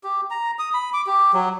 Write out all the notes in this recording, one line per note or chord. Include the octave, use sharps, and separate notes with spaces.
G4
A#5
D#6
B5
D6
G4
F#3